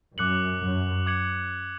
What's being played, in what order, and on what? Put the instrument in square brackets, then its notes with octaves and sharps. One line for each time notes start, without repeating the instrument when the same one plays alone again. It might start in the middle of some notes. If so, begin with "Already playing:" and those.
[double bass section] F#2 [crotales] D6 F#6 C#7 F#7
[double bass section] F#2
[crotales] D6 G#6 C#7 F#7